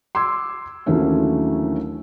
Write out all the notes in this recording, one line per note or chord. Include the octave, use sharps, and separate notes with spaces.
C6 D6 E6 G#6
D#2 D3 E3 F#3 A3 C#4